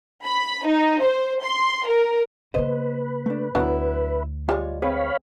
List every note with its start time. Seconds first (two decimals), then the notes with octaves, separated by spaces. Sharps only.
0.25 B5
0.66 D#4
1.03 C5
1.44 C6
1.87 A#4
2.54 C#3 A#3 B4 C5 D#5
3.26 A3 D4
3.55 D2 D3 F#3 B3 D4 E4
4.49 G3 G#3 F4 C#5 D5
4.82 C4 G#4 B4 C#5 F5 B5